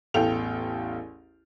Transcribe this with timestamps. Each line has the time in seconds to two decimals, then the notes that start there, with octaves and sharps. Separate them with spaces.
0.14 A1 E2 A4 F5 G5 F7